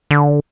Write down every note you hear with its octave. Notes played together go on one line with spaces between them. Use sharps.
D3